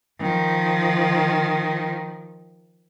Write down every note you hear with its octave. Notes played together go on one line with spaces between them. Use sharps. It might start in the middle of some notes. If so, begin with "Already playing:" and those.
D#3 F3